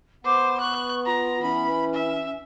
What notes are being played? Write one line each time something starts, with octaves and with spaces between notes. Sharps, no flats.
B3 C5 D6
C#6 F#6
F4 A#5
E3 C#4 B5
E5